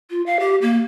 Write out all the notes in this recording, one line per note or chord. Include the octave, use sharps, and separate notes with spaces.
F4
F5
G4
A#3